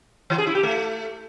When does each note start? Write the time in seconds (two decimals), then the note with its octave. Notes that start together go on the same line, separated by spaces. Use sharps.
0.30 E3
0.38 G#4
0.47 E4
0.55 G4
0.63 A3